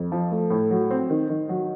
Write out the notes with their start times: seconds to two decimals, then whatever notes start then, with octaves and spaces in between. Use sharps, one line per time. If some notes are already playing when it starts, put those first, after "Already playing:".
Already playing: F2
0.12 F3
0.31 A3
0.50 A2
0.71 F#3
0.90 C4
1.10 D#3
1.29 D#3
1.49 F#3